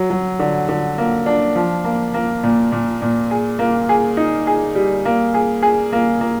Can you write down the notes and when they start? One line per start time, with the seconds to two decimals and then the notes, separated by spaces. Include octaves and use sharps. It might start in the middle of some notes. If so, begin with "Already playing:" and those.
Already playing: F#3
0.10 F#3
0.39 D3
0.69 D3
0.98 A#3
1.26 D4
1.55 F3
1.84 A#3
2.14 A#3
2.43 A#2
2.72 A#2
3.02 A#2
3.31 G#4
3.59 A#3
3.89 G#4
4.17 D#4
4.47 G#4
4.75 G3
5.05 A#3
5.34 G#4
5.63 G#4
5.93 A#3
6.21 A#3